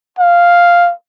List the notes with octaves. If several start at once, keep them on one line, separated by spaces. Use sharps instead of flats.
F5